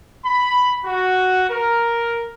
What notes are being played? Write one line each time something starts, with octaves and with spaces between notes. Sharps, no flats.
B5
F#4
A#4